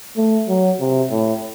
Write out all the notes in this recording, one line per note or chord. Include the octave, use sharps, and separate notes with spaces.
A3
F#3
C3
A2